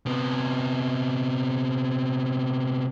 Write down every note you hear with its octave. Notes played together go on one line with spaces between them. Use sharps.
C3 B3